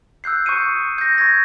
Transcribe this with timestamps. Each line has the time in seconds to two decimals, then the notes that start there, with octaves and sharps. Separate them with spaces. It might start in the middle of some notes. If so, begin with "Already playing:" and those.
0.24 E6 F#6 G6 C7
0.46 C#6 D#6 G6 C7 C#7 D#7
0.98 G6 A#6
1.18 C#6 G6 G#6 A#6